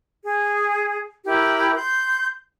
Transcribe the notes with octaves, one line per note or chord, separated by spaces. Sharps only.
G#4
E4 G4 A#4
C6 G6